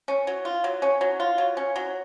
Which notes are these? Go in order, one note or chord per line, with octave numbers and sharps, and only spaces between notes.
C#4
F#3
F4
F#3
C#4
F#3
F4
F#3
C#4
F#3